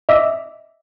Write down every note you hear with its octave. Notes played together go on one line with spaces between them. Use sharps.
D#5 E5 D6 E6